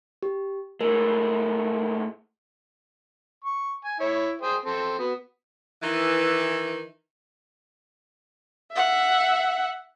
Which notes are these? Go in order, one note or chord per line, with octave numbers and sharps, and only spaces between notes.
G4
A2 G#3 A#4
C#6
G#5
E4 C#5
G#4 C5 G5
C4 A4
B3 F#4
D#3 E3
E5 F#5